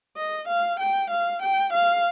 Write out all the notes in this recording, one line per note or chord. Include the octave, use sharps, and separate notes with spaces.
D#5
F5
G5
F5
G5
F5